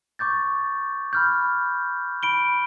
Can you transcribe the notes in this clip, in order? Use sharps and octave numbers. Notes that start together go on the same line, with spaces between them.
C#6 D6 G6 A6
B5 F6 G6
B5 D7 G7